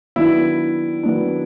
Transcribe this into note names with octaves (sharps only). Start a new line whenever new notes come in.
D#3 F#3 B3 D4 E4
D#3 F#3 B3 D4